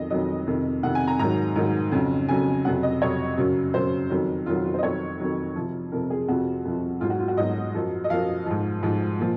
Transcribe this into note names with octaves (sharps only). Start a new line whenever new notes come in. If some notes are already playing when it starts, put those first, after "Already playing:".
Already playing: F2 D#3 F#3 D#5
F2 D#3 F#3 D#5
F2 C3 D#3
F2 C3 D#3 F#5
G#5
A#5
G#2 D#3 F#3 A#5
G#2 D#3 F#3
F2 C#3 F#3
F2 C#3 F#3 G#5
F2 C3 F#3 F#5
D#5
F2 C3 F#3 C#5
F#2 C#3 F#3
F#2 C#3 F#3 C5
F2 D#3 F#3
F2 D#3 F#3 F4
F#4
F4
C5
D#5
F2 D#3 F#3 C#5
F2 D#3 F#3
F2 C3 F3
F2 C3 F3 A#4
G#4
F2 C3 F3 F#4
F2 C3 F3
G#2 F#3 F4
F#4
F4
F#4
G#2 F#3 D#5
F#2 F3
D#5
F#2 F3 F5
G#2 F3
G#2 F3
A#2 F3